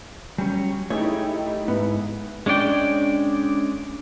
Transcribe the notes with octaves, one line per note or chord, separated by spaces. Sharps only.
F#3 G3 C#4
A3 D#4 E4 G4 G#4 C#5
G#2 B3
G#3 C#4 D4 D5 G5